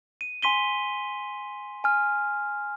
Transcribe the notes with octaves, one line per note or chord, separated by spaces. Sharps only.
D#7
G#5 C6 B6 D#7 G7
G#5 F6